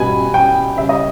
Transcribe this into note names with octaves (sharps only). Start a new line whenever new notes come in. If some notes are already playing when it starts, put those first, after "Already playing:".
Already playing: B2 G3 G#5 B5
G5
C#3 G3 E5
D#5